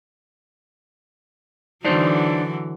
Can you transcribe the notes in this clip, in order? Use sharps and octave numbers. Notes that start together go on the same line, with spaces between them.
D3 E3 F#3 D4 D#4 C5